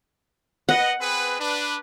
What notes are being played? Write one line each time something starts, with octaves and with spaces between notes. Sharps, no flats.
B4 D#5 F#5
C4 G#4 B4
D4 B4